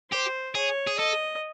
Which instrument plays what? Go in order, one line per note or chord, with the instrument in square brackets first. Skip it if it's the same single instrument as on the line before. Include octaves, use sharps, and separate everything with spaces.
[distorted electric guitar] G4 [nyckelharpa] C5
[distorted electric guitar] G#4 [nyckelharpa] C#5
[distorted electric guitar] G#4
[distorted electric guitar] A4 [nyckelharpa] D#5